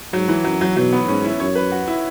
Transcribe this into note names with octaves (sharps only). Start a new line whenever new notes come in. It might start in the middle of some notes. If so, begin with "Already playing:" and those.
G#2 F#3
E3
F#2 F#3
F#3
B2 F#3
B3
G#2 C#4
E4
F#2 C#5
B4
F#4
E4